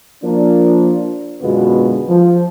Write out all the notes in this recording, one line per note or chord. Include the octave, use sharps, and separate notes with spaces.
F3 A#3 D4
F#2 B2 D3 G#3 B3 F4
F3